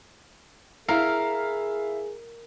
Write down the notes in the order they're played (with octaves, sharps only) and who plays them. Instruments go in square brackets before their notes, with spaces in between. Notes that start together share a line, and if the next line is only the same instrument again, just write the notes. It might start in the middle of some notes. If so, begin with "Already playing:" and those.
[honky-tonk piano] E4 F5 [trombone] G#4 [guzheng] A#4